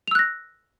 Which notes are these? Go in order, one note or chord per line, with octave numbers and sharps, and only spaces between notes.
E6 F#6 A#6 F7